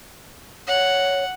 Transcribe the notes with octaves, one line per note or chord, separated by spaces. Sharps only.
C#5 F#5